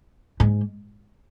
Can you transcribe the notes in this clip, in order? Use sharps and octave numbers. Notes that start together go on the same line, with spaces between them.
G#2